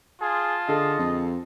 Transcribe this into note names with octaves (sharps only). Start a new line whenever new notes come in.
F4 G#4 A5 C6
D3 G#4 A4 D#5
F2